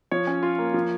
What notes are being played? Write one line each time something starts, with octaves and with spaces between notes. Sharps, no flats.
F3 C#5
C#4
F4
A#3
F3